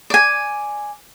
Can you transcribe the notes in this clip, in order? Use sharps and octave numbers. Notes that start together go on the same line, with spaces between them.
D5 G#5